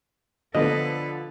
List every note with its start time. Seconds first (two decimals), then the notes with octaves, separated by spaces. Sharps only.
0.55 D3 F3 B3 A4 B4 D#5